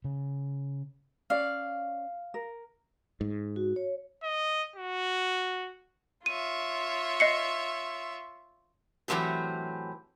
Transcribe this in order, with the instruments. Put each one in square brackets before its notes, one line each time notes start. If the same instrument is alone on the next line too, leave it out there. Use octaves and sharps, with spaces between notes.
[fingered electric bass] C#3
[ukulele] C#4 D5 [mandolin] F5
[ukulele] A#4
[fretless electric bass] G#2
[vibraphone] F#4
C#5
[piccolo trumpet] D#5
F#4
[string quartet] F4 C#5 E5 [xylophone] D#7
[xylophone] D#5 C7 C#7
[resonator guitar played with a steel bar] A2 E3 F#3 A3 C4 G4